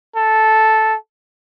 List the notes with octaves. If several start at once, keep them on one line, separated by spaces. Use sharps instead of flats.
A4